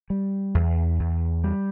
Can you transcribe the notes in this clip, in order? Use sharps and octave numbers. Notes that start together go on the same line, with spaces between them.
G3
E2
E2
G3